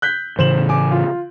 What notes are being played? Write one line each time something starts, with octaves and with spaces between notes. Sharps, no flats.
F#6 G6 B6
A2 C#3 E3 C5 E7 F#7
G#5 D6
F4